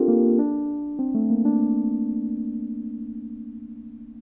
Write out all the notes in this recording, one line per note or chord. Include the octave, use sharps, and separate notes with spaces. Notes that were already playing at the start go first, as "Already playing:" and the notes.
Already playing: C4 D4 F4 G4 A4 A#4
A#3
D4
C4
A3
A#3
D4